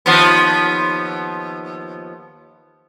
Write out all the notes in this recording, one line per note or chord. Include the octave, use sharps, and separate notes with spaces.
D#2 F3 B3